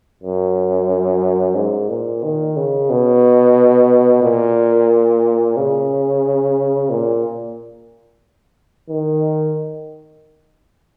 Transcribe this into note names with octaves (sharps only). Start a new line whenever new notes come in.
F#2
G#2
A#2
D#3
C#3
B2
A#2
C#3
A#2
D#3